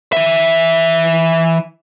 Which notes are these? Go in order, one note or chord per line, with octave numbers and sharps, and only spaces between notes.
E3 E5